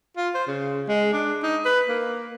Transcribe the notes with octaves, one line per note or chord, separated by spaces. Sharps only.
F4
C5
C#3
G#3
D4
D#4
B4
A#3